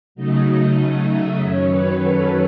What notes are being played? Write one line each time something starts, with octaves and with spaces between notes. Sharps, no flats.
C#3 F#3 A3 D#4 D#5
E5
F#2 D#3 F#3 C#4 C#5
B4
A4